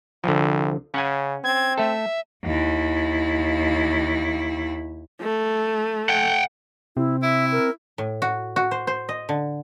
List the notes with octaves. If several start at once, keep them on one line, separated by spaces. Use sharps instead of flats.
C2 D3 F3
C#3 C#4 F#5 G#5
C4 G#6
A3 A4 E5
D#2 E4
A3
F#5 G5
C3 C4 E4
E4 E5
A#4
A2
F#4
F#4
C5
C5
D#5
D3